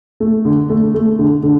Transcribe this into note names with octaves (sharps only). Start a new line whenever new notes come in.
A3
D3
A3
A3
D3
D3